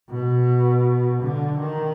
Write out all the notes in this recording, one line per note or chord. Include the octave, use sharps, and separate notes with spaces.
B2
D3
D#3